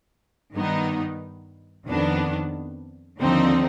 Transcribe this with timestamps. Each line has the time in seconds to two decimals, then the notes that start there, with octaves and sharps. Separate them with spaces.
0.54 G2 D#3 B3 D#4
1.87 F2 D#3 B3 D4
3.20 D#2 D3 F3 C4 D#4